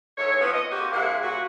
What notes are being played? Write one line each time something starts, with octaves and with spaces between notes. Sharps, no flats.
G#2 E3 A4 C#5
F3 B3 C4
D#5
A#3 C4 F#4 G4
G2 C3 A#3 E4 G#4 F#5
A#2 F#4